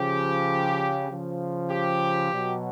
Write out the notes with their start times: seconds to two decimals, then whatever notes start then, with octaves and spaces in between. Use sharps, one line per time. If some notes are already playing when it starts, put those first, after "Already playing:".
Already playing: C#3 F3 G4
1.09 C#3 F3
1.70 G4
2.31 B2 F#3